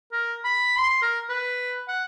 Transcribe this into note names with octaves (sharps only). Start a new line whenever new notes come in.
A#4
B5
C6
A#4
B4
F#5